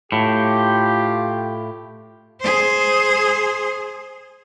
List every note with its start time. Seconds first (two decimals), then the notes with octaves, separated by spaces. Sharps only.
0.12 A2 F4 G4
2.40 G#4 C5